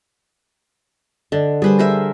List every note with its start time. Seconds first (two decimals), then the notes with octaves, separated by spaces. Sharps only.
1.32 D3 D5 D#5
1.62 G3 G#4 B4 C5
1.79 A#4 C5 E5